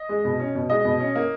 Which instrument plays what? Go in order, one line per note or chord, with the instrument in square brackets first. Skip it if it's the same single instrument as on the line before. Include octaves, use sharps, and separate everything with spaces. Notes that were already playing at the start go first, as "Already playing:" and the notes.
Already playing: [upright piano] D#5
G#3
B2
C#4
B2
G#3 D#5
B2
C#4
A#3